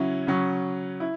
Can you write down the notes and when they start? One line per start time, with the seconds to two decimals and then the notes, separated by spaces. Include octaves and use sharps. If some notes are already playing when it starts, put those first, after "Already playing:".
Already playing: C#3 F#3 C#4 E4
0.27 C#3 F#3 C#4
1.00 E4